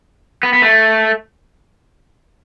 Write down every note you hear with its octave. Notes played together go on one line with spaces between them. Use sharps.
B3
B3
A3